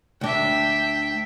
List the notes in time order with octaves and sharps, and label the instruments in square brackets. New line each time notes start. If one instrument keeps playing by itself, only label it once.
[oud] D2 D4 [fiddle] E5 G5